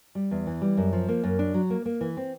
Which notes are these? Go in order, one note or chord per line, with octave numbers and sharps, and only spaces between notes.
G3
E2
E3
G3
F#2
F3
A#3
F#2
D4
F#3
A#3
A#3
E3
C4